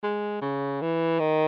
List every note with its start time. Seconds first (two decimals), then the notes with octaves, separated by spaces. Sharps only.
0.03 G#3
0.41 C#3
0.81 E3
1.19 D#3